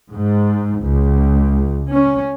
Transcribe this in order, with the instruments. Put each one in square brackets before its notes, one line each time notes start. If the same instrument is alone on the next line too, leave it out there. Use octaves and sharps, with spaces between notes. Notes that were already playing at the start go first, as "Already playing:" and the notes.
[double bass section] G#2
C#2
C#4